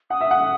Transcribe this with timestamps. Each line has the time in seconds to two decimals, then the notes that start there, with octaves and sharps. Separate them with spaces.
0.10 F#5 D#6
0.21 E5
0.31 F#5